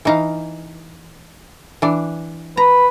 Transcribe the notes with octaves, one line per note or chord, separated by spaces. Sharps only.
E3 D#4 F5
E3 D4
B4 A#5